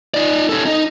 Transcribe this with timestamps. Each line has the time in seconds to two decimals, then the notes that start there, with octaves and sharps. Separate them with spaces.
0.14 D#4 D5
0.49 C#4 A4
0.65 D#4